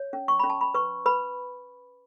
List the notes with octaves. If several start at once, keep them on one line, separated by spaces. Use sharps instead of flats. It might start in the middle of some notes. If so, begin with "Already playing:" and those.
Already playing: C#5
C#4
C#6
C#4 B5
A5
B5
B4 C#6
B4 B5